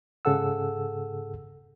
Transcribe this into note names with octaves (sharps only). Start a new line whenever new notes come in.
G#2 C#3 G#4 A4 F#5 E6